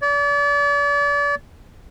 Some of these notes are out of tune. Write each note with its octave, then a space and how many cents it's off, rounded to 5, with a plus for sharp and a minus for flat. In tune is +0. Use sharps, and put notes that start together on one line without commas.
D5 -40